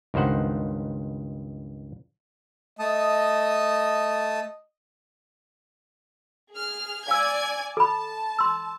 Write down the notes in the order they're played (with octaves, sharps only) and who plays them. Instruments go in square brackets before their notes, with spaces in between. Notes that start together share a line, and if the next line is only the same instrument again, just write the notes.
[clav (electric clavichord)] C#2 G2 D#3 C5 F#5
[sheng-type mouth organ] A3 A5 D#6 [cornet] D#5
[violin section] G#4 F6
[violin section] D5 G#5 G#6 [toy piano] F5 E6
[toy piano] A4 B5 [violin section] A5
[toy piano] C6 E6